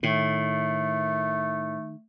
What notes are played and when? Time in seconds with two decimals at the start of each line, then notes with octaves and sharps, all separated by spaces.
0.03 A2 D#3 A3